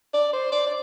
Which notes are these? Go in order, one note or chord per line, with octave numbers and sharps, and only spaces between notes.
D5
C5
D5
D5